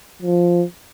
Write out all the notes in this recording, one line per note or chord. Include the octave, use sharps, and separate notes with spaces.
F3